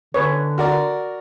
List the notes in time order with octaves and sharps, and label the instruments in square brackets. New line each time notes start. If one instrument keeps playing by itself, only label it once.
[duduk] D3 [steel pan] B4 C#5
[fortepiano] F#4 A#4 D5